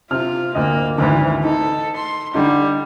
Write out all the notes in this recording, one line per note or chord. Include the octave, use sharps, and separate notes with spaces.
C3 F4 F6
D2 A#3 D#5
G#1 D2 E3
D#4 A4
C6
D3 G3 D#4